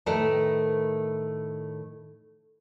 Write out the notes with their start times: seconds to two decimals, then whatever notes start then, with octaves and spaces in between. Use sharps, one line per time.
0.06 A2 D#3 A3 A#4 B4 A5